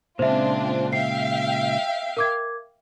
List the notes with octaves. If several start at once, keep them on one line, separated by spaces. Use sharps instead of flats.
A#2 C#3 G#3 C4 D4 F4 C5 E5
E5 F5 G5 C7
A#4 D6 G#6